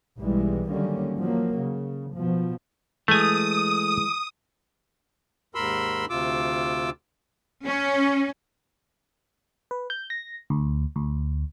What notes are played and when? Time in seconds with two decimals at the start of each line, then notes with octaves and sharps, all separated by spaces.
0.18 B1 E3 G3 G#3
0.69 D3 D#3 F#3 G3 A#3 C#4
1.17 F3 F#3 A#3
1.56 C#3
2.13 B2 F3
3.08 E3 G#3 A3 G#5 D#6
5.55 D#2 G#2 A#4 B5 C6 E6
6.10 D2 C3 F4 D6 E6
7.64 C#4
9.71 B4
9.90 G6
10.10 A#6
10.50 D2
10.96 D2